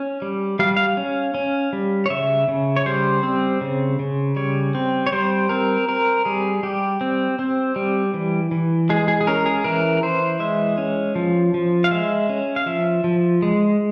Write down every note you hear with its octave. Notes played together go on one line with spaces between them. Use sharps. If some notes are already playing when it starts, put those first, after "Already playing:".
Already playing: C#4
G3
G3 F5
F5
C#4
C#4
G3
C#5
C#3 E5
C#3
C#5
G3 C5
C4
C#3
C#3
G3 C#5
C4
C#5
G3 C5
C4 A#4
C4 A#4
G3 G#4
G3 G4
C4
C4
G3
E3
E3
G#3 G#4
G#4
G#4
C#4 A#4
G#4
E3 A#4
E3 C5
G#3 E5
C#4
F3
F3
F5
G#3 E5
C#4
F5
F3 E5
F3
G#3